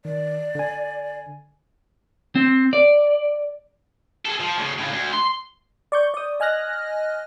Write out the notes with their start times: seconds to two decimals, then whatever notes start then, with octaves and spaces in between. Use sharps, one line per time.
0.05 D#3 D5
0.55 D3 G#5
2.35 C4
2.73 D5
4.25 G#4 A4
4.40 F3
4.58 D2 C#3
4.79 A2 C#3
4.92 D2
5.13 C6
5.92 D5 C#6 G6
6.14 D5 D#6
6.40 D#5 G#5 F6 F#6 A#6